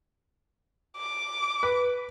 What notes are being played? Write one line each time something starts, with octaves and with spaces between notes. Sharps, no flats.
D6
B4